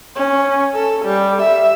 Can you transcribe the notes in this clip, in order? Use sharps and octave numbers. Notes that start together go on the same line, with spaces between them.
C#4
A4
G3
E5